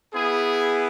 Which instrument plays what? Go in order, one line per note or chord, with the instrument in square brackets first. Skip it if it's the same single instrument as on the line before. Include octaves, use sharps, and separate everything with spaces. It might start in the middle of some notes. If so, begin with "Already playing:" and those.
[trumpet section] B3 E4 G#4